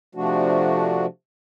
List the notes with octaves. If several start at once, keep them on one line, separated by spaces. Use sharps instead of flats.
C3 F3 A3 D4 F#4